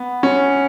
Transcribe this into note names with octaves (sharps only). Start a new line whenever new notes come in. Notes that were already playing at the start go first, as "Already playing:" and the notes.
Already playing: B3
C#4